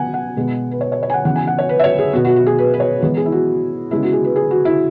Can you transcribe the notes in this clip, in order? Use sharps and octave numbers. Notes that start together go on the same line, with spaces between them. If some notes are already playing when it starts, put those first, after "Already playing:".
Already playing: B3 F#5 G#5
F#5
B2 G#3 B3
B4
C#5
C#5
C#5
G#5
F#5
C#3 E3 B3 F#5
G#5
F#5
C#5
B4
E5
C#5
G#4
B2 B3 F#4
F#4
F#4
G#4
B4
B4
C#5
E3 G#3 B3
G#4
E4
F#4
C#3 G#3 B3 E4
F#4
G#4
B4
G#4
F#4
E4